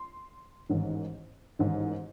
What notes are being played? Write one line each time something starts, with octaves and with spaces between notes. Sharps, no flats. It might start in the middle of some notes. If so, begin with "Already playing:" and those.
Already playing: C6
A1 G#2 D#3
A1 G#2 D#3